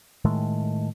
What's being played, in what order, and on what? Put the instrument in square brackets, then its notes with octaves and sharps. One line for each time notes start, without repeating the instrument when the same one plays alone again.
[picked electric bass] A2 D#3 G#3 A3